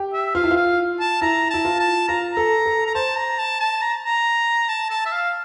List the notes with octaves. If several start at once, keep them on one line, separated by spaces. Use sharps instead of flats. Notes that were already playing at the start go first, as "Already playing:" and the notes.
Already playing: G4
E5
F4 F5
E4
F4
F5
A5
E4 A#5
E4 A5
F4
A5
F4 A#5
A4 A#5
A4
A#5
C5 A5
A#5
A5
A5
A#5
A#5
A5
A5
E5
F5